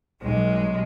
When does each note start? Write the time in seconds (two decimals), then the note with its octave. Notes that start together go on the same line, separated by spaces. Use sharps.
0.23 B1 G#3